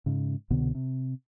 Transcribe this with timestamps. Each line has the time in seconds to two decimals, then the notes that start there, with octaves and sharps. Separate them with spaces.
0.06 G#2 C#3
0.50 C2 B2 D3 B3
0.75 C3